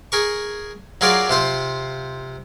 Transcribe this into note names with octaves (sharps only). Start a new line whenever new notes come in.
G#4 A#4 C#6
F#3 F4 G#4 A#4 D5 F5
C3 F4 C5